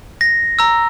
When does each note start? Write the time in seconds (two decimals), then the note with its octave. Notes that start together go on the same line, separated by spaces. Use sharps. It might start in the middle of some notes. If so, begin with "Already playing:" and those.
0.21 A#6
0.59 A#5 E6